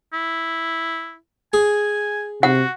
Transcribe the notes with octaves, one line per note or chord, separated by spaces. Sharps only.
E4
G#4 G#5
C3 F#4 F#5